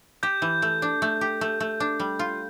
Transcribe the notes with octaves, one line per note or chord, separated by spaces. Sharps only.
G4 G6
E3
A3
D4
A3
G4
A3
A3
D4
G3
F4